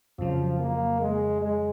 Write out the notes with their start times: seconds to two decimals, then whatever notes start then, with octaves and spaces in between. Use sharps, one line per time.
0.18 F2 C#3 F3 F#3
0.59 A#3
1.00 G#3
1.41 G#3